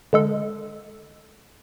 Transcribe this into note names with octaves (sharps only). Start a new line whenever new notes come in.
D3 G#3 A4